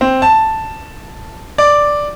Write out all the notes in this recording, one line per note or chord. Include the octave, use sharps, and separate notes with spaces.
C4
A5
D5